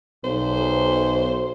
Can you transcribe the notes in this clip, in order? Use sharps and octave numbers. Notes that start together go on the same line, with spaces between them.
B1 C5